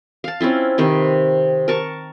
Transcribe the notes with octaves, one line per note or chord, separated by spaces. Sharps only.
F5 A5
C4 C#4 E4 F4
C3 D#3 B4 C5
A#4 A5 C#6